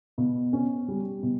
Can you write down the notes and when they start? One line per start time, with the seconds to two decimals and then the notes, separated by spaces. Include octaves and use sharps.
0.18 B2
0.53 C#4
0.88 G3
1.23 B2